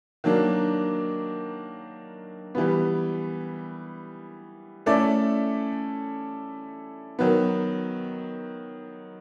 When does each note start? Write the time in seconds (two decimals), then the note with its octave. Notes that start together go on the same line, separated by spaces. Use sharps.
0.24 D#3 F#3 A#3 D4
2.55 E3 G3 B3
4.86 A3 C#4 E4 A4 D5
7.19 D#3 F#3 B3